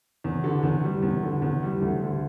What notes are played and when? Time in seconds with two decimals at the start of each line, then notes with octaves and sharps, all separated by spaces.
0.24 E2
0.44 D3
0.63 E2
0.84 G3
1.02 E2
1.23 D3
1.42 E2
1.63 G3
1.82 D2
2.01 D3